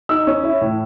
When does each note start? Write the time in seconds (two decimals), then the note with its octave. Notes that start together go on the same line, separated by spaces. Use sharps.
0.09 D#4 E6
0.27 C#4
0.43 E4
0.61 A2